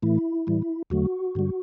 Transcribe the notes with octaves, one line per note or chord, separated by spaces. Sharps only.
A2 E3 A3 E4
A2 E3 G3
E2 D3 F#3 A3 F#4
G2 D3 G3